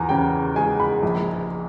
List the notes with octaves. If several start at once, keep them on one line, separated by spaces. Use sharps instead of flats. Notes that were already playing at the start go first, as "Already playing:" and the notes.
Already playing: E2 G#5 A#5
C#3 G5
G#3 G#5
B5
A#1